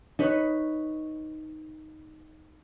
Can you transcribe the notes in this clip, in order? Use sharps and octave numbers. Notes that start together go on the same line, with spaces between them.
D#4 B4 C#5